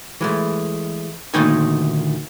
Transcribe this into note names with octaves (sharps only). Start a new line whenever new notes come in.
E3 G#3 A3
D2 A#2 D#3 A3 D#4 G#5